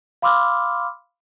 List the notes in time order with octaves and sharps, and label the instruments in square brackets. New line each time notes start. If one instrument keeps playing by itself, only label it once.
[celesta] F5 B5 C6 D6 E6 F6